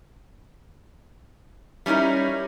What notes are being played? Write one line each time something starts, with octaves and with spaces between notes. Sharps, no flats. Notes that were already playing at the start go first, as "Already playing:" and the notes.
G3 C#4 D#4 E4 A#4